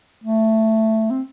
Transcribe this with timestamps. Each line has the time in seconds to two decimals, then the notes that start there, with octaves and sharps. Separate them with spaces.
0.24 A3
1.11 C4